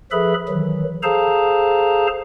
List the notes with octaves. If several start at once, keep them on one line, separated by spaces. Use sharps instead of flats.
F3 G#4 A4 B4 E5 B5
D#3 E3 F#3
G#4 A4 C5 F5 A5 A#5